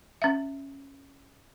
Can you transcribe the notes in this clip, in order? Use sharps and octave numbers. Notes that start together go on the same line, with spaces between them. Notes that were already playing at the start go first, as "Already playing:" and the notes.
C#4 E5